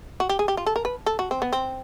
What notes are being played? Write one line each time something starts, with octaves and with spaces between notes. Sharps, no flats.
F#4
G4
G#4
G4
F4
A4
A#4
B4
A4
F#4
C4
B3
C4